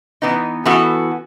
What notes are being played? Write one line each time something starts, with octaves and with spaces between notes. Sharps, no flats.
E3 B3 D#4
E3 B3 F#4 A4